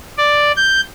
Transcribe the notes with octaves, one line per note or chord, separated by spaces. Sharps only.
D5
G6